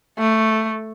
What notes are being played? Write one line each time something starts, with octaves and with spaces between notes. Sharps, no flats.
A3